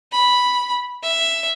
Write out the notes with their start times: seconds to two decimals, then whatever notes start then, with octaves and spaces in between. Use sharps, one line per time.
0.12 B5
1.03 E5